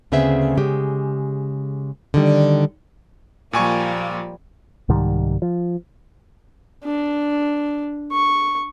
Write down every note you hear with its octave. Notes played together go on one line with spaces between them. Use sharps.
D2 C#3 B3 C4 G#4 E5
C#3 G#3 G4
D3 D#3 G3
A#2 F3 G3 A#3 G#5 C#6
C2 G#2 D#3 G3
F3
D4
C#6